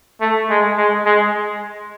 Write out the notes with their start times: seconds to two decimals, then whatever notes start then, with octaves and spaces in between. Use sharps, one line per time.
0.21 A3
0.50 G#3
0.78 G#3
1.06 G#3